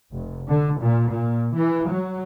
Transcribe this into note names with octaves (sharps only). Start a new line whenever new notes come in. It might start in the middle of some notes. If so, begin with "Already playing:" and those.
F1
D3
A#2
A#2
E3
F#3